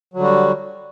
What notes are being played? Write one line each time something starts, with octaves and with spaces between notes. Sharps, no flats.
D3 F#3 G3 F#4